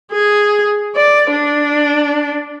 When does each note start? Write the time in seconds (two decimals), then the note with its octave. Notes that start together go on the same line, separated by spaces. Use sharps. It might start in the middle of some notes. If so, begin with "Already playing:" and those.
0.12 G#4
0.96 D5
1.31 D4